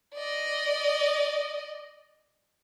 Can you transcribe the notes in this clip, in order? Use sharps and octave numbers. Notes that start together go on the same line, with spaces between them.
D5 D#5